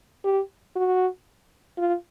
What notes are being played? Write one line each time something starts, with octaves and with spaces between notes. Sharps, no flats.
G4
F#4
F4